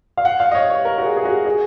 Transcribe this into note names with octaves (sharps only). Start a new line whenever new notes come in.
F5
F#5
F5
D#5
C#5
C#5
A#4
F#4
G#4
G#4
F#4
G#4